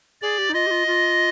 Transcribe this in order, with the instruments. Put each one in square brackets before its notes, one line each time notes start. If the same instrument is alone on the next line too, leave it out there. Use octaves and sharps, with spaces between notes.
[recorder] G#4 [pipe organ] D5
[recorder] G4
D#4
[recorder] F4 [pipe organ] D#5
[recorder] G4
F4
F4